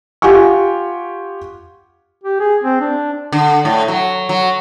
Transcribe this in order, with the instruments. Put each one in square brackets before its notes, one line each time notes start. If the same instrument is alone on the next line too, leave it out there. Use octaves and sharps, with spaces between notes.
[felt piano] F4 G4 F#5 G#5 C#6
[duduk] G4
G#4
C4
D4
[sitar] D3
A2
F#3
F#3